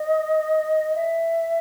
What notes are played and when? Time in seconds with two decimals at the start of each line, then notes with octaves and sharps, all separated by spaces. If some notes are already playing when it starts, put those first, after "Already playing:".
Already playing: D#5
0.95 E5